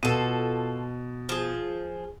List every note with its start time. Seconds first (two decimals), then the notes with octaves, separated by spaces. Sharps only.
0.03 B2 F4 A4 D#7
1.29 F3 G#4